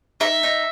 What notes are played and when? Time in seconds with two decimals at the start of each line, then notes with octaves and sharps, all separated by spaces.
0.20 D#4 E5
0.43 D#4